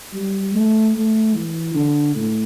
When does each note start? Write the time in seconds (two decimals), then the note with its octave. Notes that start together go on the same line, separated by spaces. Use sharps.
0.14 G3
0.54 A3
0.95 A3
1.34 E3
1.74 D3
2.15 A2